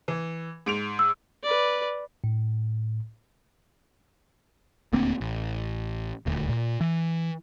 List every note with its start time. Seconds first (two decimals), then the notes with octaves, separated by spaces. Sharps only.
0.08 E3
0.66 G#2 D7 F7
0.99 E6
1.43 B4 D5
2.24 A2
4.93 D#1 D2 A#3 C4
5.21 A1
6.26 D#1 D2
6.49 A#2
6.81 E3